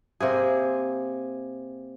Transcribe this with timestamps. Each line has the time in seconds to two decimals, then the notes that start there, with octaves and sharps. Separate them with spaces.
0.20 C3 A#3 G#4